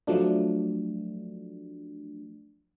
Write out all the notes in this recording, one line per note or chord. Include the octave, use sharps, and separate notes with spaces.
F3 F#3 A3 D4